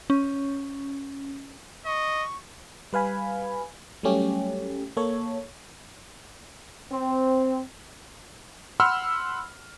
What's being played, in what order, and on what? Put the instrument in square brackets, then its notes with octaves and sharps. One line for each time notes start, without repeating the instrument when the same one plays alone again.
[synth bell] C#4
[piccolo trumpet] D#5 [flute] C#6
[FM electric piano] G3 B4 F5 G#5 B5
F#3 G3 A3 C#4 G4
A#3 A4 C#5
[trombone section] C4
[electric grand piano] F#5 B5 C6 E6 F6